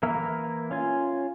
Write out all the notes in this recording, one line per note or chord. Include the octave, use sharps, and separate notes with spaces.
E3 A#3 E4 A#4
C#4 F4 G#5